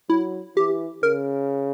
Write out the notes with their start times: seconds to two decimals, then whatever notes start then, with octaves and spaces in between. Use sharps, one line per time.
0.10 F#3 E4
0.56 E3 G4
1.03 C#3 A#4